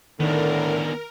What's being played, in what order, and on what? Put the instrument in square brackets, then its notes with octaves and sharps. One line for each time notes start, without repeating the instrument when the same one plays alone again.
[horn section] A2 D3 [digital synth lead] D#3 [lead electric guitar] B3 D4 [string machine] A#4